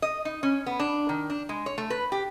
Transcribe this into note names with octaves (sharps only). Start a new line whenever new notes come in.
D#5
D#4
C#4
B3
D4
D#3
D4
G#3
C#5
A3
B4
G4